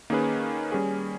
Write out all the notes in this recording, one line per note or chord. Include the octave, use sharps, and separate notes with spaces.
D#3 A#3 C#4 G#4 B4
G3 C#4 G#4